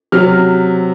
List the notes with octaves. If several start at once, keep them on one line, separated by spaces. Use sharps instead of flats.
C3 F#3 F6